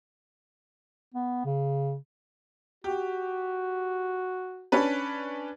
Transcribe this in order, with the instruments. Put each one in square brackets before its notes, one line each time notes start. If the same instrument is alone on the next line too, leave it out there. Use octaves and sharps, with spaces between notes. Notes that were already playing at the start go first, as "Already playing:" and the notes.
[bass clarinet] B3
C#3
[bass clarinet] F#4 [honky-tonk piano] G4
[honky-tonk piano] C#4 D4 B4